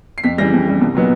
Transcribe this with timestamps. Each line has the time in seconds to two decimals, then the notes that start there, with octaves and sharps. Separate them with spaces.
0.18 C7
0.24 F2 B6
0.38 C#3 E3 G3 A#6
0.53 F2
0.66 C#3 E3 G3
0.81 C2
0.95 A#2 F#3 B3 D#4